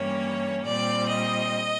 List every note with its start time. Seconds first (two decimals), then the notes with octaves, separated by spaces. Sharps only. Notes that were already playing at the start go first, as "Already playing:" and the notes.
Already playing: G2 E3 G3 A#3 C#4 C#5
0.64 A#2 G3 C4 D5
1.08 D#5